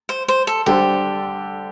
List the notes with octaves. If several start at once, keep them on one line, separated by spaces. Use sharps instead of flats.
C5
C5
A4
D3 G3 D4 G4 A4 C5